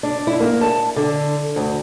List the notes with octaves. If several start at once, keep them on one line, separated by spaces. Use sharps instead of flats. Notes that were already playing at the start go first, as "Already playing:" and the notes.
D4
E4
A#3
A5
D3
D2